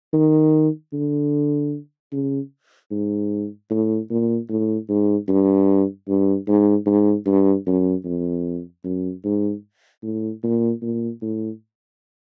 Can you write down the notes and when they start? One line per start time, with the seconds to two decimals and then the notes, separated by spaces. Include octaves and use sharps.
0.14 D#3
0.93 D3
2.12 C#3
2.91 G#2
3.71 A2
4.10 A#2
4.49 A2
4.89 G#2
5.28 G2
6.08 G2
6.48 G#2
6.86 G#2
7.26 G2
7.66 F#2
8.05 F2
8.84 F#2
9.25 G#2
10.03 A2
10.43 A#2
10.82 A#2
11.22 A2